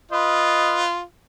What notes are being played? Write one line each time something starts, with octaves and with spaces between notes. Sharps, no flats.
F4 B4 D#5